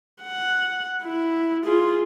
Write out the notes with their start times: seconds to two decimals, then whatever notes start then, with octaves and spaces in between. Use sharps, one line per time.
0.22 F#5
1.03 E4
1.64 F4 G#4